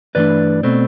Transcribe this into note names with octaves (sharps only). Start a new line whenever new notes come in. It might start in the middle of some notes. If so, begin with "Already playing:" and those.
G2 E3 A3 D4 B4 D5
B2 A3 C4